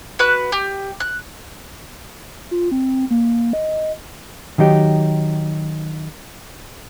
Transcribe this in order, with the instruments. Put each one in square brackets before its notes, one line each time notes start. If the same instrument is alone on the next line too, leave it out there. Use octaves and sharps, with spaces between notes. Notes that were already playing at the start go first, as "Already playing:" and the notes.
[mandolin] F#4 B4 F#6
G4
F#6
[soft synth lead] F4
C4
A#3
D#5
[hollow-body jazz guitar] D#3 F#3 D#4 G4